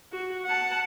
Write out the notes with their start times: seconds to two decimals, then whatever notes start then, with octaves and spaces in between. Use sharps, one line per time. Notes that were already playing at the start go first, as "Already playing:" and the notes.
0.13 F#4
0.46 F#5 A5